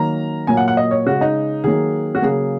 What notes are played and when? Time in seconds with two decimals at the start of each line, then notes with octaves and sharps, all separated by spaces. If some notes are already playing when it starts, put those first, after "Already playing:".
Already playing: D#3 F#3 A#3 A#5
0.47 A#2 F#3 A#3 G#5
0.57 F#5
0.68 F#5
0.77 D#5
0.91 C#5
1.06 C#3 G#3 F#4
1.21 D#4
1.64 D#3 F#3 A#3 G#4
2.15 F#4
2.22 C#3 F#3 A#3 G#4